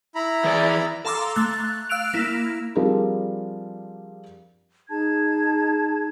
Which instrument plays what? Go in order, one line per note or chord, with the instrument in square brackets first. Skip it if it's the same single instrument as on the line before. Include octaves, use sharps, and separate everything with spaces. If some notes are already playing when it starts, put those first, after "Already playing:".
[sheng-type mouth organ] E4 A#5 B5
[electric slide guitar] E3 G#4 D5
[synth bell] A4 F5 A#5 C6 D6 E6
A3 F#6
F5 E6 F#6 D7 F7
A#3 E4
[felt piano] F3 G3 C4 D4 G#4 A#4
[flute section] D#4 G#4 A5 G#6